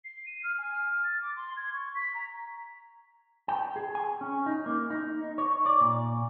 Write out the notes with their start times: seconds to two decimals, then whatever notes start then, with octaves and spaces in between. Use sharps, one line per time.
0.04 C7
0.26 D#7
0.43 F6
0.58 G#5
0.72 F6
1.03 A6
1.21 D6
1.36 C6
1.56 G#6
1.72 C#6
1.95 B6
2.14 A#5
3.48 G5
3.76 G#4
3.95 G#5
4.21 C#4
4.46 D#4
4.66 A#3
4.90 D#4
5.38 C#5
5.66 D5
5.81 A#2